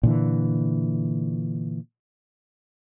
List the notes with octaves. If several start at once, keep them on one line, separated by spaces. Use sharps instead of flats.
A#2 D3 E3